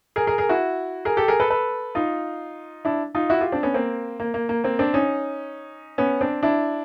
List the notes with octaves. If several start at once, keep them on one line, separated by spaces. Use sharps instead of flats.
G#4 A#4
G#4 A#4
G#4 A#4
E4 F#4
G#4 A#4
G4 A4
G#4 A#4
A4 B4
A4 B4
D#4 F4
D4 E4
D#4 F4
E4 F#4
F4 G4
C4 D4
B3 C#4
A#3 C4
A#3
A#3
A#3
A#3 C4
C4 D4
C#4 D#4
B3 C#4
C4 D4
D4 E4